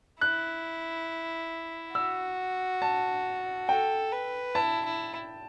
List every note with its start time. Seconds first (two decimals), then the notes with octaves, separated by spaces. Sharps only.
0.21 E4 F#6
1.95 F#4 E6
2.82 A5
3.69 A4 G5
4.12 B4
4.55 E4 A5
4.85 E4